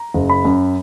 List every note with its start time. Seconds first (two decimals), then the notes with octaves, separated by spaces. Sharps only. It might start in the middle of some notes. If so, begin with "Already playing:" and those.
Already playing: A#5
0.14 F#1
0.30 B5
0.45 F#2